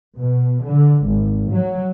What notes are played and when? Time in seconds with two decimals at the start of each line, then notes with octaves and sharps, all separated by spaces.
0.17 B2
0.65 D3
1.06 G#1
1.52 F#3